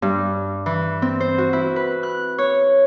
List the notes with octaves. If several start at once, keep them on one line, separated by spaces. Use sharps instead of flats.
G2
E3
C4
C5
F#4
E4
B4
F#6
C#5